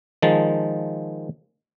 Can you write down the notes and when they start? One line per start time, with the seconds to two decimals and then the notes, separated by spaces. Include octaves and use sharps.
0.22 D#3 F3 G#3 A5